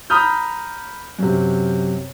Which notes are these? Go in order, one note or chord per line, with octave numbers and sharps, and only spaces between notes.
A#5 B5 D#6 F6 G6
F#2 C3